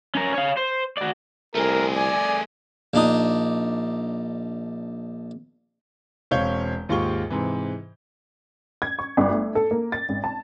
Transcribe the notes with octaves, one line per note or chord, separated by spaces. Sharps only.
C#4 A#4
C#5 F5
C5
F#4 D5
C2 A3 G#4 A#4
D5 G#5
A#1 D4 D#4 D#6
E1 C4 C#5 F5 G6
D#2 G#2 F4 G4 C#6 G7
G#2 C3 E3
G#6
C#6
G1
A3
A4
A#3
A6
G#1
A5